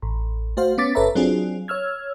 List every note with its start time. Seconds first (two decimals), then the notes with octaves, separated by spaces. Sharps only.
0.02 A1
0.57 A3 F#4 C5 F5
0.78 B3 C#4 D6 A6 B6
0.95 G1 A4 B4 C#5 E5 A#5
1.15 F#3 C4 D4 F4 G#4
1.68 C#5 E6 F6 G#6